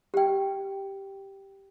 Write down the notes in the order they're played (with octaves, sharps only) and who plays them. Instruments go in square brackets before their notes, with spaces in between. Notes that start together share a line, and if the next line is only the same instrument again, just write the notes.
[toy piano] G4 G5